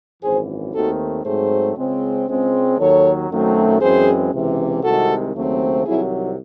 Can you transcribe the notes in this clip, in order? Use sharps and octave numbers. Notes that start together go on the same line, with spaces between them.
G#1 F#2 E3 G#4 C5
D#2 D#3 A3 C4 F#4 A4
G#2 F#3 A3 C4 G#4 C5
C#2 C#3 G#3 C4
C#2 C#3 G#3 C4
D#2 D#3 F#3 A4 C#5
F#2 D#3 F#3 A3 C4
F#2 E3 G#3 C4 G#4 C5
C#2 C3 E3
C2 C3 D#3 G#3 F#4 A4
D#2 C#3 F#3 A3 C4
C2 C3 D#3 F#3 E4 G#4